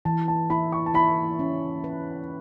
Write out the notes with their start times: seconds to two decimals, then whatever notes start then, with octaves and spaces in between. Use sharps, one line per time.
0.05 E3 A5
0.28 A5
0.50 E4 B5
0.72 C#6
0.86 A5
0.94 E4 B5
1.39 C#4
1.84 B4